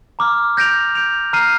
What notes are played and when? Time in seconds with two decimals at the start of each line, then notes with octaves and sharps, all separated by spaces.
0.19 A#5 D6 F6
0.57 G6 A#6 D7 F7
0.95 G6 D7 F7
1.33 A#5 F6 C7 D#7